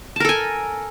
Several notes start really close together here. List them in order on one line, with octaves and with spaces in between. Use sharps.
A5 A#4 A4 G#5